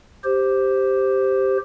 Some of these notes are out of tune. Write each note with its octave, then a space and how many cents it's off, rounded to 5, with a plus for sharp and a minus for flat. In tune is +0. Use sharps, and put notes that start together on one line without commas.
G4 +0 C5 +0